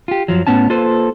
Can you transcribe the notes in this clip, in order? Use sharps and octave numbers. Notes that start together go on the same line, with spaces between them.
F4 G4
F#2 F3 F#3
A2 B3 C#4 A5
A#3 F4 A4 B4 C5